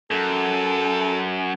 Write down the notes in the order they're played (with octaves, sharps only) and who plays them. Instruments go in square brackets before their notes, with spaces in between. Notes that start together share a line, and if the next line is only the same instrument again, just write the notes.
[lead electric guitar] F#2 [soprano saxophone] A4